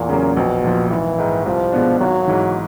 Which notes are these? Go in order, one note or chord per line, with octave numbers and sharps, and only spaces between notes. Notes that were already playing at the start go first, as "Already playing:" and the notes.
Already playing: E2 A#2
C#3 F#3 A#3 C#4
A#1 B2
A#2 F3
G#1 E3
G#2 D#3
C2 F3
B2 G#3 B3 D4
G#1 F#3
G#2 E3